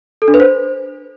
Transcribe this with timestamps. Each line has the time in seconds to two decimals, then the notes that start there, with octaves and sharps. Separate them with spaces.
0.22 A4
0.28 D4
0.34 B4
0.40 C5